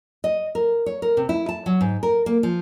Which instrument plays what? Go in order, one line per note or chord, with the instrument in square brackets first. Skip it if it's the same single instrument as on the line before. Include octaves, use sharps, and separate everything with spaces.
[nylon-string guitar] D#5
A#4
C#5
A#4
C3
E4
A5
F#3
G#2
A#4
A#3
F3